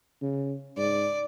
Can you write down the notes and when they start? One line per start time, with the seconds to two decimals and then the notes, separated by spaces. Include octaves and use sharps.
0.22 C#3
0.77 G#2 D5